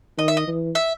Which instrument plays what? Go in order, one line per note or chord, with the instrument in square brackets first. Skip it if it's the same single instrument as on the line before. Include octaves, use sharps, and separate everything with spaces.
[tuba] D#3 [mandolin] D#5
[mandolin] E5
D#5
[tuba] E3
[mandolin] E5